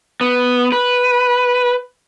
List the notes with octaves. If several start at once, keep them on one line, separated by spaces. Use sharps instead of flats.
B3
B4